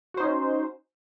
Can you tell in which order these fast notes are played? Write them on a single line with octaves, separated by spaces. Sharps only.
F#4 C5 D#4 C#4